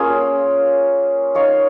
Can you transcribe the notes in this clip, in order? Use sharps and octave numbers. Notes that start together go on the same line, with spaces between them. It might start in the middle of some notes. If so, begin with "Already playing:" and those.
Already playing: A#3 C#4 F4 G#4
D#4 C#5 F5